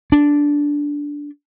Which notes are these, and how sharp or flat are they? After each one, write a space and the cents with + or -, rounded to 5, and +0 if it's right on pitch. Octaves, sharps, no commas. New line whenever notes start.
D4 -10